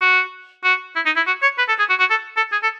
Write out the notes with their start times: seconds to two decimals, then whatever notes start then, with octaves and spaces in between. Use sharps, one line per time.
0.01 F#4
0.64 F#4
0.96 E4
1.06 D#4
1.16 E4
1.27 F#4
1.42 C#5
1.58 B4
1.68 A4
1.79 G#4
1.89 F#4
2.00 F#4
2.10 A4
2.37 A4
2.52 G#4
2.63 A4